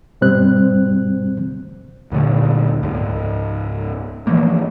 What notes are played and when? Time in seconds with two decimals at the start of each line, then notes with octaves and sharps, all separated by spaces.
0.21 G2 B2 G3 C4 C5 F#6
2.12 D2 A#2 D3 A3
2.83 C#2 G#2
4.27 E3 F3 A3 A#3